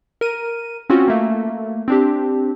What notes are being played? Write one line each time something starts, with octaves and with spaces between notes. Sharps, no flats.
A#4 D#7
C4 C#4 F4 F#4
A3 A#3
C4 D4 G4